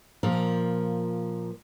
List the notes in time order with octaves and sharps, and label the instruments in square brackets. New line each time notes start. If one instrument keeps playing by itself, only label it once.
[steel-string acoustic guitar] A#2 F3 A#4